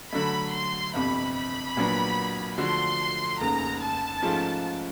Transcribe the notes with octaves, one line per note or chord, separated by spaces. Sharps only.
D3 F#3 A3 B5
C6
G1 F2 C3 B5
B5
A#1 A#2 F#3 B3 D4
D3 F3 A3 D4 F#4 C6
F1 D#2 C#3 A#5
A5
G#2 F3 A3 C#4 F4